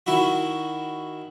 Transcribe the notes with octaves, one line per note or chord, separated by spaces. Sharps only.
D#3 E4 F#4